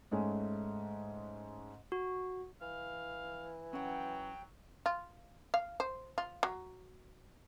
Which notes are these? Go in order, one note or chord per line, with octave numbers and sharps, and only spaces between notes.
G#2 G#3 A3 C#4
F#4
E3 F5
F#3 C#4 F#5 G5
F4
F5
C5
F4
F#3